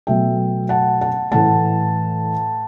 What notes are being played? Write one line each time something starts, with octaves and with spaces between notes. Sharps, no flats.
B2 F#3 A3 E5 G5
F#5 A5
F#5 A5
A2 E3 A3 F#5 A5